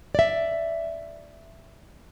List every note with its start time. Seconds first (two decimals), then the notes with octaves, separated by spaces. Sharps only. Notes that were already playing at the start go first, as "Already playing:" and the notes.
0.15 D5 E5